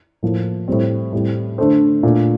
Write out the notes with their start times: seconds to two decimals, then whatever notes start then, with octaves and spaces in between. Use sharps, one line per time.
0.23 A2 F3 A#3
0.68 A2 G3 C4
1.12 A2 G3 C4
1.58 D3 A3 D4 A4 C5
2.03 A#2 A3 D4